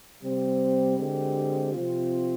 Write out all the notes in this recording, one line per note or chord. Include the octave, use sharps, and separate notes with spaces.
C3 G3 C4 G4
D3 G#3 C4 G4
C3 F3 C4 F4